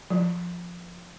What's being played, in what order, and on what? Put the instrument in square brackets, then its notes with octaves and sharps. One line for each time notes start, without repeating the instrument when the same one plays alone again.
[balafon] F3